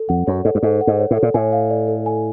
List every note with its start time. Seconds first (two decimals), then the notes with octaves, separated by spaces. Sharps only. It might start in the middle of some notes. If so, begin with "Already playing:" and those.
Already playing: A4
0.09 F2 F#5
0.27 F#2 C#5
0.45 G#2 A4
0.55 G2
0.63 G#2 A4
0.81 F#5
0.87 G#2
0.99 C#5
1.11 A2
1.17 A4
1.23 A#2
1.34 A2 G#5
1.52 F5
1.70 D5
1.88 A4
2.06 G#5